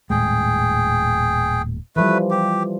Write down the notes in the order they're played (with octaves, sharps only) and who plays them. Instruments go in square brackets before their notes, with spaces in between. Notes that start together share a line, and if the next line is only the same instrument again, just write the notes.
[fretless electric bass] D#1 A2 G#3 [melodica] G#4 G5
[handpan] E3 F3 G3 [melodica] A3 B4
[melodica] G4